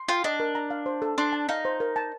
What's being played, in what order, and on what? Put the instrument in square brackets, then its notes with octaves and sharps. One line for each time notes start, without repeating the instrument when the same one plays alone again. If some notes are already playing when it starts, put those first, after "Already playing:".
Already playing: [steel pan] C6
[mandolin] F4 [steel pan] G5
[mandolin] D4 [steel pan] D#5
[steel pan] A#4
A#5
F5
C5
A4
[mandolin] D4 [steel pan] C6
[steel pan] A5
[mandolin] D#4 [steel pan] F5
[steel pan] C5
A#4
A5